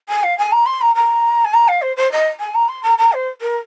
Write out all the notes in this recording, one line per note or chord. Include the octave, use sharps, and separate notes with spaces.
G#5
F5
G#5
A#5
C6
A#5
A#5
G#5
A#5
F5
C5
C5
D#5
G#5
A#5
C6
A#5
A#5
C5
A#4